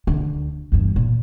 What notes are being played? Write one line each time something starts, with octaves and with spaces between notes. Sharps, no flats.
D2 D3
E2 G2
A#2